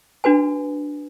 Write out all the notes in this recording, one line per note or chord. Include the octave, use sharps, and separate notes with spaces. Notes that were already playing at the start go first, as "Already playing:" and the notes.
D4 F#4 B4 G#5